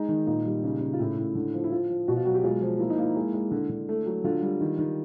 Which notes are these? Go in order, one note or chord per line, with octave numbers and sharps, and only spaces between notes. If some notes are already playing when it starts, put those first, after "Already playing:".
Already playing: G#3 D#4
D#3
A#2 D#4
G3
C#3
C#3
F4
A2 E4
A2
D3
F3
E4
F3 F4
F3
B2 F#4
F4
F#3 F#4
G4
G#3 F4
F3
A#3 E4
D#4
A#3 E4
G#3
G#3
D3
D3
A3
F#3
D3 F4
G3
D#3
D#3